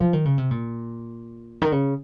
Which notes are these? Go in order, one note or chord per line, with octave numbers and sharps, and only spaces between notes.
F3
D#3
C#3
C3
A#2
D#3
C#3